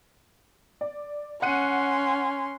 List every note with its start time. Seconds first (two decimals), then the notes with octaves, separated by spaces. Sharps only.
0.81 D5
1.42 C#4 F#5 C6 F#6 D#7